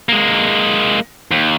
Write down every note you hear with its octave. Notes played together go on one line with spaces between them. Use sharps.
G#3 A#3
D#2